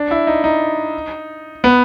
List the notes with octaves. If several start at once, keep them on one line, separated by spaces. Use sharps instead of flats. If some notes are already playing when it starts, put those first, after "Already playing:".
Already playing: D4
E4
D#4
D#4
B3